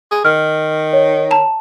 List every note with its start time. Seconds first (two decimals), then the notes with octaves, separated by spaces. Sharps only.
0.11 G#4
0.25 D#3 F6
0.93 C#5
1.31 A5 A#5